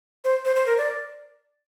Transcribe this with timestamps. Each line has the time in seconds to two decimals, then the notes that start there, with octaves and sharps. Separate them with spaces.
0.25 C5
0.45 C5
0.56 C5
0.66 A#4
0.78 D5